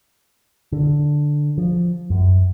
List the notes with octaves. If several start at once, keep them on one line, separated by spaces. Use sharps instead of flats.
D3
F3
F#2